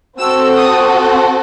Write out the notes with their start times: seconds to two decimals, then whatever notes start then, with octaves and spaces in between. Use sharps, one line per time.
0.19 C4 F#4 A4 E6
0.57 D#6